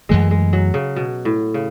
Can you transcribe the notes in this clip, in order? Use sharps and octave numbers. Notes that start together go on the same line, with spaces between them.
F#2 E3 G#3 A3
G#3
F#3
C#3
B2
A2
C#3